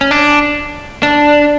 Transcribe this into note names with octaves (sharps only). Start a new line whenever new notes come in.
C#4
D4
D4